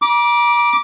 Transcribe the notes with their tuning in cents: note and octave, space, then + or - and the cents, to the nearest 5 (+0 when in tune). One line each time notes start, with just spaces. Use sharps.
A#5 +45 D6 +0